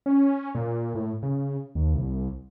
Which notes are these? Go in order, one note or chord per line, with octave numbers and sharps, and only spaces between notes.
C#4
A#2
A2
C#3
D#2
C2